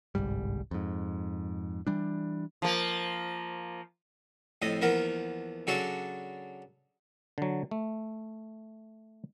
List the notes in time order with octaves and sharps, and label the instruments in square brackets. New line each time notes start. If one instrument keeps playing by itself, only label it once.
[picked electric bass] G1 C2 G#2 G3
F2 G#2
E3 G3 D4
[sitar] F3 A#3
[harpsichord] F2 A2 D#5 D#6
E2 F3 A#3 B3 A#4
C#3 F#3 D4 F#4 A4
[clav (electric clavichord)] D3 F#3
A3